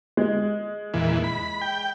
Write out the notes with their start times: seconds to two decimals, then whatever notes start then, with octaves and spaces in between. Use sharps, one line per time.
0.17 G#3
0.94 E2 A#2 E3
1.24 B5
1.62 G5